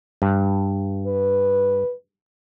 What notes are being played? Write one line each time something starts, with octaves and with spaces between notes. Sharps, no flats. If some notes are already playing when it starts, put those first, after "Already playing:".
G2
B4